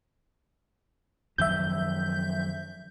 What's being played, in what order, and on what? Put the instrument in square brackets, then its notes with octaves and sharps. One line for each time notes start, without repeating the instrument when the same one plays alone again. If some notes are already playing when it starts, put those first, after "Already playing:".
[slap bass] F#2 D#3 F3 [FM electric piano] E5 G6